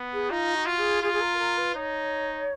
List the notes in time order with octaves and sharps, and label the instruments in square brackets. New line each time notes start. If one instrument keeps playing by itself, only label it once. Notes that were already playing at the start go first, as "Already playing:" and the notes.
Already playing: [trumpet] B3
[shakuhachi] G#4
[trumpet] D#4 [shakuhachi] F4
[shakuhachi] F#4
[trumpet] F4
[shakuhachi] G#4
[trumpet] F4 [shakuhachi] G#4
[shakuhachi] G#4
A#4
A#4
B4
[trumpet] D#4 [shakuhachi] C#5